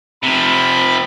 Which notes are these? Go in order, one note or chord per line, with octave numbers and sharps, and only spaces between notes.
C3 F3 B5